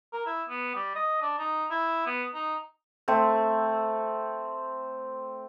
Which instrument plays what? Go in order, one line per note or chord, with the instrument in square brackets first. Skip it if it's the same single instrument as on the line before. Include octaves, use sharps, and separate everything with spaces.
[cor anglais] A#4
E4
B3
G3
D#5
D4
D#4
E4
B3
D#4
[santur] A3 C4